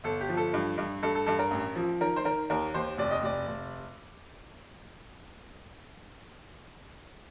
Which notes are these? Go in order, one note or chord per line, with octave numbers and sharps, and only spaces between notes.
G1 A4
G4
F3
A4
G2
G2
G2 A4
A4
G2 A4
A#4
A1
F3
D#3 A#4
C5
D#3 A#4
D#2 A#4
D#2 C5
F1 D5
D#5
F1 D5
F1